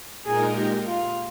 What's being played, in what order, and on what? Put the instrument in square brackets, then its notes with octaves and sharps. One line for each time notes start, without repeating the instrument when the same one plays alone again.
[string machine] A#2 G#3 D#4 A#4 [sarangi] G#4
[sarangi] G4
F4